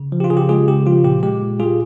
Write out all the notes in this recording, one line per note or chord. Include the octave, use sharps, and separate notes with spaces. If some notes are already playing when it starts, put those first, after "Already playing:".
Already playing: C#3
F3
G4
F4
C#3 G#4
G4
G#3 F4 G#4
C#3 G4
F3 F4
A#2 G4
G#3 G4
A#2
G3 F4 G#4